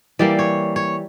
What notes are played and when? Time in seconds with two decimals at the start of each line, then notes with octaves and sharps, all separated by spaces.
0.19 E3 G3 A#3 D5
0.39 C#5
0.76 C#5